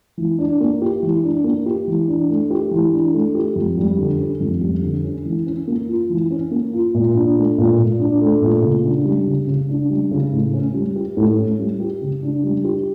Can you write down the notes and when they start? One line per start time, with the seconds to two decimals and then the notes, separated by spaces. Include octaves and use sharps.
0.17 E3
0.38 D4
0.60 A#3
0.82 G4
1.03 E3
1.23 D4
1.44 A#3
1.66 G4
1.87 E3
2.08 D4
2.29 A3
2.50 G4
2.71 E3
2.92 D4
3.13 A3
3.35 G4
3.56 F2
3.77 G3
3.98 D3
4.19 C#4
4.40 F2
4.61 G3
4.82 D3
5.04 C#4
5.25 E3
5.47 C#4
5.67 A#3
5.88 F4
6.10 E3
6.31 C#4
6.51 A#3
6.73 F4
6.94 A#2
7.15 D4
7.36 A3
7.58 A#2
7.79 A#2
8.00 D4
8.21 A3
8.41 A#2
8.63 C#3
8.85 D4
9.05 G3
9.27 C#3
9.47 C#3
9.69 D4
9.90 G3
10.11 C#3
10.32 A2
10.53 C#4
10.74 G3
10.96 G4
11.17 A2
11.38 C#4
11.59 G3
11.80 G4
12.01 C#3
12.23 D4
12.43 G3
12.64 G4